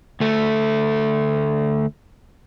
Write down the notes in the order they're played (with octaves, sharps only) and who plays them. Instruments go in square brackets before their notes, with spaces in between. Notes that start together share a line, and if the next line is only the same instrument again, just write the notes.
[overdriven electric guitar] D2 A3